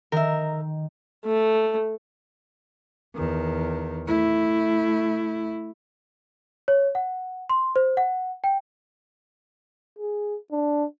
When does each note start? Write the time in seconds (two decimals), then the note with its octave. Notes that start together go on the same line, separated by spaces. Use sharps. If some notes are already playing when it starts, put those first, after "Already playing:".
0.12 D#3 A#4 E5
1.25 A3
3.16 E2 D#3
4.07 A3 E4
6.68 C#5
6.95 F#5
7.50 C6
7.76 C5
7.97 F#5
8.44 G5
9.99 G#4
10.52 D4